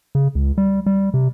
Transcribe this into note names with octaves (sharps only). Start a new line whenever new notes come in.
C#3
C#2
G3
G3
C3